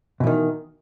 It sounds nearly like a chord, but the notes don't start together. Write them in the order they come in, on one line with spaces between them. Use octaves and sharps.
B2 E3 D#3